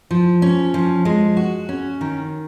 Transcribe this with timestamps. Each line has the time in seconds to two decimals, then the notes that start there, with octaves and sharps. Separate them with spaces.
0.11 F3
0.42 C#4
0.74 F3
1.05 G#3
1.37 F#4
1.69 C#4
2.01 D#3